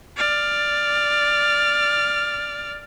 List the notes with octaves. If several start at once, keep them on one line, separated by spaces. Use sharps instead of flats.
D5 F6